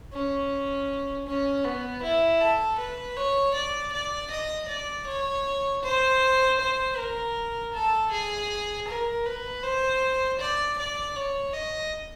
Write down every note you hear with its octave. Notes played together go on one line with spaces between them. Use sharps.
C#4
C#4
B3
E4
A4
B4
C#5
D5
D5
D#5
D5
C#5
C5
C5
A#4
A4
G#4
A#4
B4
C5
D5
D5
C#5
D#5